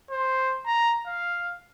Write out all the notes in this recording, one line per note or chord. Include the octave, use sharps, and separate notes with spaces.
C5
A#5
F5